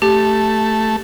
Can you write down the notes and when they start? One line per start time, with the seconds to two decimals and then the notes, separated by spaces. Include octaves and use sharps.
0.02 A3 G4